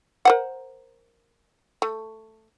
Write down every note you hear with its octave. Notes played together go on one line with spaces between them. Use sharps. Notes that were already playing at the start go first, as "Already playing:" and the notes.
A#4 C5 F#5
A3